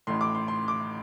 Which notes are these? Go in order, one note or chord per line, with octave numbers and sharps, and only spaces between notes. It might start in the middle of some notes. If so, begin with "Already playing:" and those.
A1 A2 C6
D6
C6
C6
D6